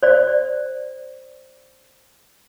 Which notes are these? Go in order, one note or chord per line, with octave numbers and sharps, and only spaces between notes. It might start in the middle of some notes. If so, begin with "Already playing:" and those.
C5 D5